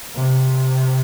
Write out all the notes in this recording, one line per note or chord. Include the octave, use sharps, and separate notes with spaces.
C3